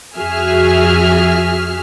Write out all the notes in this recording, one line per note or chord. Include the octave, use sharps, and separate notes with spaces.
F2 F#4 G#4 E5 F6